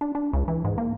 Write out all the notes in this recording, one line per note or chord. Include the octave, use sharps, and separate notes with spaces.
D4
D4
C#2
E3
G#2
A#3